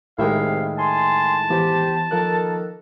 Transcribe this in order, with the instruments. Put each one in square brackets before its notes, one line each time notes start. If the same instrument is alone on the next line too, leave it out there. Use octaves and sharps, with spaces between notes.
[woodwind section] C2 [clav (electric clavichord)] A2 D#3 G#3 [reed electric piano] E4 E5 G5 [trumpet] F5
[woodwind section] G#5 C6 [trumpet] A5
[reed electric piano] E3 B3 [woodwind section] G4 C5
[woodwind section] D#3 A#3 A4 [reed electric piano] F3 A#4 F#6